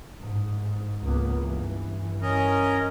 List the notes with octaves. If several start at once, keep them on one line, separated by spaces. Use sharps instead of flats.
G#2
C#2 A#3 B3
G2 E3
C#4 A#4 D#5